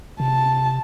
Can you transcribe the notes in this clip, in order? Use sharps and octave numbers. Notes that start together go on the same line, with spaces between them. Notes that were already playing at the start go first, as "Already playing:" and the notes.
C3 A5